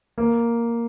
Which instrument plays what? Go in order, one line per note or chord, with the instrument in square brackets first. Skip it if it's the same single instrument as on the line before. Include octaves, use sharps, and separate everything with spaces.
[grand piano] A#3